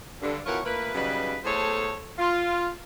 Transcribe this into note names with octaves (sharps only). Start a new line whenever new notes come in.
G2 D3
B2 E3 F4 A#4 C#5 F#5
A3 A#3 F4 B4
C#3 F#3 G3 D#4 B4
E2 A3 G#4 A4 C5 C#5
F4